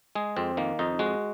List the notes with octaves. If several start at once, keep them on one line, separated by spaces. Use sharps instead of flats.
G#3 G#4
F2 C4
D#3 A#3
F2 D#4
G#3 F#4